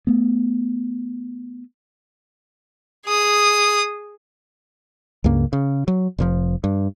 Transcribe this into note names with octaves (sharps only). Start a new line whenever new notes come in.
A3 B3
G#4 D#6
C#2 G2 C#3 A#3
C#3
F#3
F1 G#2 F3
G2